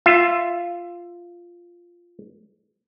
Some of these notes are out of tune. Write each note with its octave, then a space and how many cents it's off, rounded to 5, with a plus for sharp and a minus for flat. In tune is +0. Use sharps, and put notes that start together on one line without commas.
F4 -5 E5 +20